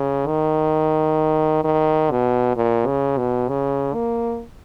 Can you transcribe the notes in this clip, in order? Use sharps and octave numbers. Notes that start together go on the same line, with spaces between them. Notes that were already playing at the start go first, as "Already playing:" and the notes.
Already playing: C#3
D#3
D#3
B2
A#2
C#3
B2
C#3
A#3